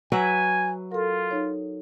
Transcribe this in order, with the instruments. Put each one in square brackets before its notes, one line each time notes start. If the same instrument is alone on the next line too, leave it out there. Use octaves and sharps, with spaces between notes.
[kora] F#3 B4 E5 [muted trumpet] G#5
[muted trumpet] F4 [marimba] A4 A#4
[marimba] D#4 C#5